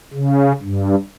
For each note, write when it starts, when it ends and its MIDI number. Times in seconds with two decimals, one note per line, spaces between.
0.13 0.52 49
0.63 0.95 43